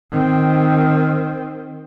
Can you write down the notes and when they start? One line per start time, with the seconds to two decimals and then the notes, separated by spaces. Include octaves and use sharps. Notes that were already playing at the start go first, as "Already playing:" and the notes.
0.12 D#3 C4